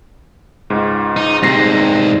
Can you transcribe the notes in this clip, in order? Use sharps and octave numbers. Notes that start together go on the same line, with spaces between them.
C#2 G#2
D#4
G#2 C3 G3 A#6 C7